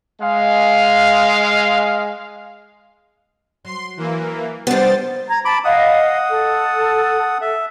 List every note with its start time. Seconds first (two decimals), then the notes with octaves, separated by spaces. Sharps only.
0.20 G#3 F5
3.65 F#3 C6
3.97 E3 A#3
4.67 F3 G3 B3 D4 C5 A6
5.29 A#5 G#6
5.45 A5 B5 D6
5.64 D#5 F5 F#5 D#6
6.29 A4
7.41 E5